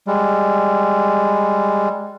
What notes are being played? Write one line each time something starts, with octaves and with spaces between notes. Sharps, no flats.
G3 G#3